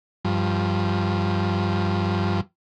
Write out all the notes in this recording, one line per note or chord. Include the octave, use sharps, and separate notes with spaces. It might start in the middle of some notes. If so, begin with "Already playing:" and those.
G2 F3